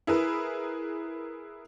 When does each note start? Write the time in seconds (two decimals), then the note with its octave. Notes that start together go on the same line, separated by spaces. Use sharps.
0.07 E4 G#4 A#4 B4